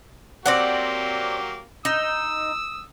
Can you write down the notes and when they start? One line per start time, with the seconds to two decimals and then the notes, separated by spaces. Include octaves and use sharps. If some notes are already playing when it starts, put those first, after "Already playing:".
0.46 F#3 A#3 C4 G4 D5 F#5
1.85 D#4 D#6 E6